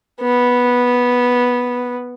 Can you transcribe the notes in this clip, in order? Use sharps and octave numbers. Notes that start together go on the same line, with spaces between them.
B3